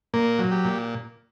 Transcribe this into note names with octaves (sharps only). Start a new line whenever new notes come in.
A#2 A#3
F#3
G4
A#2